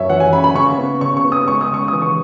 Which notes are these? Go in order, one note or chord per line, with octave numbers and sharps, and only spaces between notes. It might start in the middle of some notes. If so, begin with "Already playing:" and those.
Already playing: F#2 C#5 E5
E3 F#5
G#5
C#4 B5
B5
C#3 C#6
B3
C#3 C#6
C#6
B3
D#6
G#3 C#6
D#6
C#3 C#6
E3 D#6
C#6